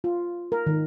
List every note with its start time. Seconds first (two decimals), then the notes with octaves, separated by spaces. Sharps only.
0.04 F4
0.52 A#4
0.67 D#3